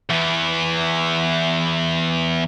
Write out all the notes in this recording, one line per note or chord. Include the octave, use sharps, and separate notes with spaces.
E2 E3